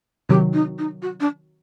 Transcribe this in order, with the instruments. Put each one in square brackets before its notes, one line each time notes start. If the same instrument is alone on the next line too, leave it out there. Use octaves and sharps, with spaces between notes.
[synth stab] C3 D#3 F#3 [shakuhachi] G4
[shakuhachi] D#4
D#4
F#4
D4